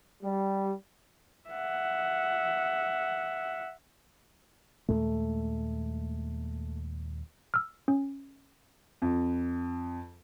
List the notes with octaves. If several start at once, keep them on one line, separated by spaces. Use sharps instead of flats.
G3
E5 F#5
D#2 A#2 G#3 A3
E6 F6
C#4
F2